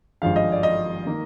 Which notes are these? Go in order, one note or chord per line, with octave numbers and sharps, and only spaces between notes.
G#1 G2 F3 G#3 F5
D#5
D5
D#5
D#3 A#3